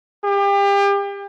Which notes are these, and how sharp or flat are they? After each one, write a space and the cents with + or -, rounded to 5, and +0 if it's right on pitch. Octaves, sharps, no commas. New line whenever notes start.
G4 +35